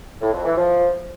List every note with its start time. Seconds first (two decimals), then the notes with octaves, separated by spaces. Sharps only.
0.21 A2
0.33 F2
0.44 E3
0.56 F3